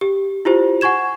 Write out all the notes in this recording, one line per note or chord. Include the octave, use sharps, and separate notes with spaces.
G4
E4 F4 G4 C5
F#5 G#5 C#6 G#6 E7